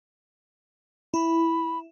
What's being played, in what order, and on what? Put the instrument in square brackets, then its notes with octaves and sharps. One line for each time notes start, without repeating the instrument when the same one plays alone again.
[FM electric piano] E4 [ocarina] B5